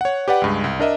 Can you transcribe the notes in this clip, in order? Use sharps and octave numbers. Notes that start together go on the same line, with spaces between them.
C#5 F#5
G4 B4 D5 F#5
C#2 G2 G#3
C2
D4 A#4 D#5 E5